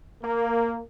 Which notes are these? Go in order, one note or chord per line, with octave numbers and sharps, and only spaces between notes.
A#3